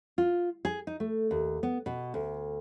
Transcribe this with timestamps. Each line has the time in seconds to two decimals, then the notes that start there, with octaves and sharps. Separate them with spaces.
0.18 F4
0.65 G#4
0.87 D#4
1.00 A3
1.31 D#2
1.63 B3
1.86 B2
2.14 D2